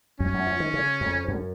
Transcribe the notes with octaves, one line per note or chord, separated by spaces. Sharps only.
F#2 C#4
F#2
F3
D#3
C#3
F2
F#2